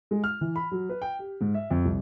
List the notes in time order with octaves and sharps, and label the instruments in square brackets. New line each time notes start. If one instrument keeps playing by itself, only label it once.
[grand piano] G#3
F6
E3
B5
F#3
B4
G5
G4
G#2
E5
F2
C2